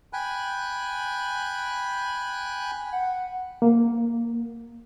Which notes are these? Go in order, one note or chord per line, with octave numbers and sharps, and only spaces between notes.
G5 G#5 B5 F#6
F#5
A#3